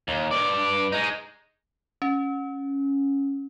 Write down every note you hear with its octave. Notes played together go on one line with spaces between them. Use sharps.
D#2
G2 D5
G#3 D#4
C#4